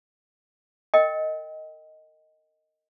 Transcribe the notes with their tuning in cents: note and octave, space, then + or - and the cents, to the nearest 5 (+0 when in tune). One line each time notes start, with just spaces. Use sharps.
A#4 -35 D#5 +5 G5 +0